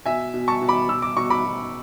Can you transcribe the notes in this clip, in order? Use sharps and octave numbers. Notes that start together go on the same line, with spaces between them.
B2 E5 G#5
B2
A5 C#6
B2
B5 D6
B2 E6
D6
B2 C#6
B5 D6
B2